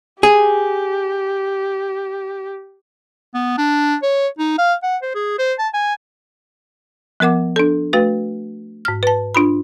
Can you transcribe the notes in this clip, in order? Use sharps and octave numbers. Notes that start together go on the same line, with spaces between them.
G4 G#4
B3
D4
C#5
D#4
F5
F#5
C5
G#4
C5
A5
G#5
F3 B3 A#4 F#5 D6
D4 A4
A3 F#4 B4 F5
G#2 F6
B4 A5
D4 F4 B5